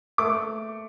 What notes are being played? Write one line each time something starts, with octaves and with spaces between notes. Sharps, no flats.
A3 D6